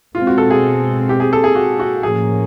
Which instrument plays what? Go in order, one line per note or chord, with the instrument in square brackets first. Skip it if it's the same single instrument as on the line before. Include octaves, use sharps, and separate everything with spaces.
[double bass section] B2 G#3 C4 [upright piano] F4
[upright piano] F#4
A4
G#4
G4
G#4
A4
G#4
F#4
F#4
[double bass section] A2 F3 A#3 C#4 [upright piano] G#4